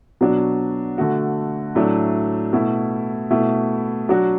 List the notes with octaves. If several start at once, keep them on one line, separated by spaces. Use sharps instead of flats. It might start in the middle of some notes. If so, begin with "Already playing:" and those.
B2 F#3 D4 F#4
D3 A3 F#4
A2 F#3 A3 D4
B2 A3 E4
B2 A3 E4
F#3 D4 F#4